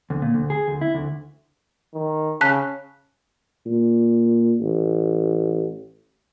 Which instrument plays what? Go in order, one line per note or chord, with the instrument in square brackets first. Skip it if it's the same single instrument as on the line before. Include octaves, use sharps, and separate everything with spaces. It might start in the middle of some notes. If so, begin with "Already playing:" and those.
[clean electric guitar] D2
A#2
D2
G#4
D2
E4
D2
[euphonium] D#3
[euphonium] C#3 [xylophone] A5 F#6 B6
[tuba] A#2
A1